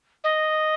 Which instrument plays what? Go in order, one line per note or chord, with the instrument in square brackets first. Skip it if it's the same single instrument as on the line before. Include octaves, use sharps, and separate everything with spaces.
[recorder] D#5